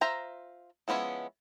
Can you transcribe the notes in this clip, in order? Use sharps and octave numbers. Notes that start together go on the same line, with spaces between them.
F4 C5 E5 A#5
F3 G#3 B3 C#4 E4